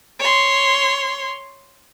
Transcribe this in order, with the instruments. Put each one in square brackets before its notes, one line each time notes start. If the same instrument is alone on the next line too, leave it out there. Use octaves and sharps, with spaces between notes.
[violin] C#5 C6